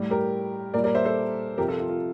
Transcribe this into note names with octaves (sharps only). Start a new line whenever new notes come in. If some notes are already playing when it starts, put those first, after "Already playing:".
Already playing: A2 G3
G4 A#4
A#2 G3 A#4 D5
A#4 D5
C5 E5
A4 C5
C3 F3 G4 A#4
F4 A4
F4
F4